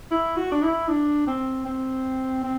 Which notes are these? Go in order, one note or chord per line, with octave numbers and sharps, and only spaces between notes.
E4
F#4
D4
E4
D4
C4
C4
C4